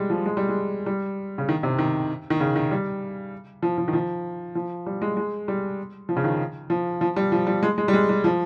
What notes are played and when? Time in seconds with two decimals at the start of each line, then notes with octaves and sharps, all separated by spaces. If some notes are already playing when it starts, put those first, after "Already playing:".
Already playing: G3 G#3
0.10 F3
0.26 G#3
0.37 G3
0.49 G#3
0.86 G3
1.38 C#3
1.49 D#3
1.63 C3
1.78 D#3
2.30 D#3
2.40 C#3
2.56 D#3
2.71 G3
3.63 F3
3.78 F3
3.88 D#3
3.93 F3
4.55 F3
4.86 G3
5.02 G#3
5.17 G#3
5.48 G3
6.09 F3
6.16 C#3
6.24 D#3
6.70 F3
7.01 F3
7.16 G3
7.32 F3
7.47 G3
7.63 G#3
7.78 G#3
7.88 G3
7.93 G#3
8.09 G3
8.24 F3